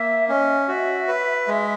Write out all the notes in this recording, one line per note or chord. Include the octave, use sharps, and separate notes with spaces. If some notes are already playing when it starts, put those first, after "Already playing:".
Already playing: A#3 E5
C#4 D#5
F#4 E5
B4
G#3